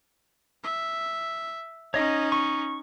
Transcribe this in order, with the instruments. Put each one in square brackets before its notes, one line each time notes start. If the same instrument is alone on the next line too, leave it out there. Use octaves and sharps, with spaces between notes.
[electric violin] E5
[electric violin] C#4 D#4 [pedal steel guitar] C#5 D#5
[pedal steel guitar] C#6